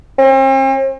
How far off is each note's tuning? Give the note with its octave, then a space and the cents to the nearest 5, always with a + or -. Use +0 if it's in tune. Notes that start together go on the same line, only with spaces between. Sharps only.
C4 +40